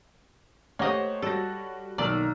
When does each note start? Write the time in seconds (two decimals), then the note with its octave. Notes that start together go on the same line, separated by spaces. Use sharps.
0.79 A3 A#3 G4 C5 C#5 D#5 F#5
1.22 G3 F#4 A4 A#6
1.98 B1 D#3 A#3 D5 A#5 E6 F6